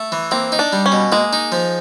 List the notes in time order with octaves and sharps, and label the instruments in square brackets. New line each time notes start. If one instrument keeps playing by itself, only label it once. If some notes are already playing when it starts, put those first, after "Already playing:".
Already playing: [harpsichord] A3
E3
[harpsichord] A#3 [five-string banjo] C4
[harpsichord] D#4
[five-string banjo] D4
[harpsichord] G3
[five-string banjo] C#4
[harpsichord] B2
[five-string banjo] G#3 [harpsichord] A#3
[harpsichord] D#4
F3